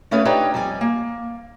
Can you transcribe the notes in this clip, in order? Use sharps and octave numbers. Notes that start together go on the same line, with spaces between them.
A3 B3 C#4 F4 G#4 B4
D4 D#4 F4 G4 B4 C#5
F2 G3 D5 G#5
A#3